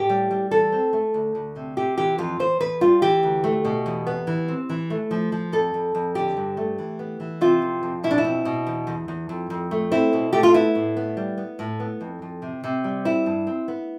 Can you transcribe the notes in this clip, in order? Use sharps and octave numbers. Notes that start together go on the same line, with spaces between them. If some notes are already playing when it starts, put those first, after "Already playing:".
Already playing: A2 G4
G3
G3
E3 A4
C4
A3
D2
D2
C3
C3 G4
E3 G4
F2 F4
E2 C5
E2 B4
G3 F4
E3 G4
D2
A3
B2
E2
B3
E3
C4
E3
A3
F3
F3
F2 A4
F2
F2
D3 G4
G2
A3
E3
B3
E3
C3 F4
F2
F2
B2 E4
D4
E4
C4
B2
E2
E2
E2
F2
F2
A3
C4 E4
B2
A3 G4
F4
B3 E4
A2
B3
G3
B3
A2
B3
F2
F2
C3
C3
G3
C4 E4
G2
C4
B3